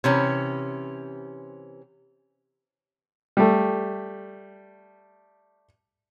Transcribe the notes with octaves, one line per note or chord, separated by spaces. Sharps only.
C3 E3 C#4
G3 A3